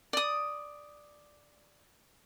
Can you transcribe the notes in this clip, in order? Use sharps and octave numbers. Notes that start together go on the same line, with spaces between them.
D5 D#6